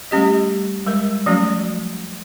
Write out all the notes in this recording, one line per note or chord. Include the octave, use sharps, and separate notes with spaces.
G3 A3 C#4 G4 D#5
G3 G#3 A#4
F3 F#3 A3 C#4 F#4